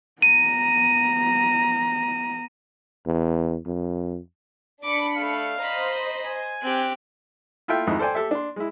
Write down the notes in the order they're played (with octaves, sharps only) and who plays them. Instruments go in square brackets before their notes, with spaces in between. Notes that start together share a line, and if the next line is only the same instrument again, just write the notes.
[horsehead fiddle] B3 A#5 [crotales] D#7
[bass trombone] E2
F2
[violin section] D4 B5 C#7 [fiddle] D6
[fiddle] A3 [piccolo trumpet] F5
[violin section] C5 D#5 [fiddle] A#5 B5
[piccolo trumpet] G#5
[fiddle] C4 G4 [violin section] F#6
[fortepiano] E4 F4 A4 E5 G5
F2 G#2 D#3 E4 D#6
A4 C5 D5 G5 G#5
G4 A4 E5
D4 C6
G#3 E4